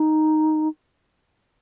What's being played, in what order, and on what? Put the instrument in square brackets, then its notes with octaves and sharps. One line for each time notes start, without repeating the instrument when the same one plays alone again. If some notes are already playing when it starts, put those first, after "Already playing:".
Already playing: [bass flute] D#4